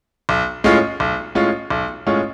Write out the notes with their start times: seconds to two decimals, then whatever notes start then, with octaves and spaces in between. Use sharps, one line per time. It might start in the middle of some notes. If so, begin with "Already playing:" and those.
0.29 B1
0.64 A2 G#3 C#4 F4
1.00 B1
1.35 A2 G#3 C#4 F4
1.70 B1
2.07 A2 G#3 C#4 F4